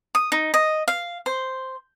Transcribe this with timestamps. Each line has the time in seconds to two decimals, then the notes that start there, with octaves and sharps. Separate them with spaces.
0.15 D#6
0.32 D#4
0.54 D#5
0.88 F5
1.26 C5